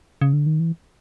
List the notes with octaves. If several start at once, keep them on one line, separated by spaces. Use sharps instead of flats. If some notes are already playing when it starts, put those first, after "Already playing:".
C#3
D3
D#3
E3